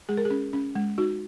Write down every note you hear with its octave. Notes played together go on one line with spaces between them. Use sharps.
G#3 G#4
A#4
G#4
C#4
C#4
G#3
D#4 F#4